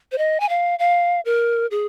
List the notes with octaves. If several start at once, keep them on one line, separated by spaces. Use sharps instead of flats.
C5
D#5
G#5
F5
F5
A#4
G#4